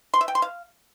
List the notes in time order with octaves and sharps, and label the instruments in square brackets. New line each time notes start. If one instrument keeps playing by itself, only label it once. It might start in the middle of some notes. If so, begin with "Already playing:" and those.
[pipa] C6
E5
G5
C6
F5